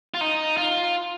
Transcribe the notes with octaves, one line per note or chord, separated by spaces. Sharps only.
F4
D#4
F4